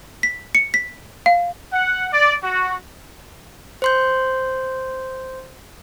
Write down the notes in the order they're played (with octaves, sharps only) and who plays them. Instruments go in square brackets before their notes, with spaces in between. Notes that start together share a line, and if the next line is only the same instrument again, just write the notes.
[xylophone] B6
C#7
B6
F5
[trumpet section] F#5
D5
F#4
[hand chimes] C5 C6 G6